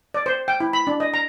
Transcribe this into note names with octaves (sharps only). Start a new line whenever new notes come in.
D5
C5
G5
E4
B5
D4
D#5
A#5